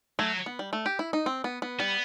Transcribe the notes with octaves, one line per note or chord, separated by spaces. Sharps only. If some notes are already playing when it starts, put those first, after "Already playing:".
F#3 A3
B3
G3
A3
G4
E4
D#4
C4
B3
B3
G3 B3